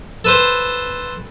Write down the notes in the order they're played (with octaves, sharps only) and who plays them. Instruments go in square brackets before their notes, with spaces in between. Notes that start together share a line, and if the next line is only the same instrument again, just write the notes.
[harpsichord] A4 B4 C5